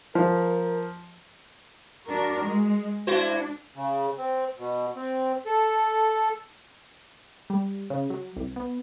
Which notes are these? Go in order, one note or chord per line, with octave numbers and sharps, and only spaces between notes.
F3 A#4
D4 F#4 A#4
G#3
D4 E4 F#4 C5
C#3
C4
B2
C4
A4
G3
C#3
F#3
C2
B3